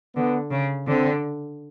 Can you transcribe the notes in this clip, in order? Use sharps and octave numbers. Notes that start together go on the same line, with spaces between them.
D3 B3
C#3
D3 C4